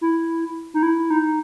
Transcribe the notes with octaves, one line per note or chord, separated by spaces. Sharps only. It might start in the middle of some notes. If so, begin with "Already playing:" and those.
E4
D#4
E4
D#4